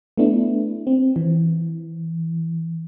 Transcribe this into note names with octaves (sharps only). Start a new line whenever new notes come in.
A3 B3 D4 E4
C4
E3